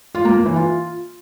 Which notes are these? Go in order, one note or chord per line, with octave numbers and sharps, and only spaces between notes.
F4
A#3
A#3
E3
F4